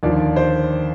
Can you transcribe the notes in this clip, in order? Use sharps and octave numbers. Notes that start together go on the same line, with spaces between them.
D#2 D3 F3 D5
C5